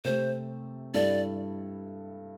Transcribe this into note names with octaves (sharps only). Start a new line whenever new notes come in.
C3 A3 C4 C5
G2 G3 E4 A4 D5